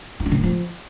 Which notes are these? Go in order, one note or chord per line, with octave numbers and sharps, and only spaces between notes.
D#4
D4
D#3
E3
F3